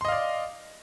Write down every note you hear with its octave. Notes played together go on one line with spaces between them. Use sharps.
D5 D#5 F5 C6